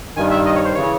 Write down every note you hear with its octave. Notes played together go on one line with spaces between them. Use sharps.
G2 D#3 G#5
E5
D#5
C#5
C5
C#3 E3 C#5